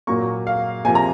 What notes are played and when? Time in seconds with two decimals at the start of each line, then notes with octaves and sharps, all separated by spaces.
0.07 A#2 F#3 A#3 C#6
0.47 F5
0.85 C3 F3 A#3 G#5
0.95 A#5